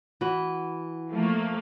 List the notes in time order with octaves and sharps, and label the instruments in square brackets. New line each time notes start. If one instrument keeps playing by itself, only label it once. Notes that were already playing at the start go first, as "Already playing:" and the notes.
[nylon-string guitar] E3 F#4
[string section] F3 A3 A#3